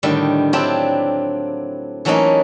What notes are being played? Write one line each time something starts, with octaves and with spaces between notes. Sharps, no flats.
A2 D3 D#3 G3
F#3 C4 D4 E4 F4 G4
E3 F#3 A3 A#3 C#4 D#4